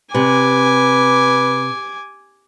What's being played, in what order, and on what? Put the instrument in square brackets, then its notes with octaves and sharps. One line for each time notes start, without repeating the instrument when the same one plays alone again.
[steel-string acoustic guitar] C3 [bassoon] B4 [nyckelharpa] G#5 D6